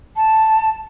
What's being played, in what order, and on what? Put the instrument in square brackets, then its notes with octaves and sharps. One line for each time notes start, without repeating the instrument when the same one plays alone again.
[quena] A5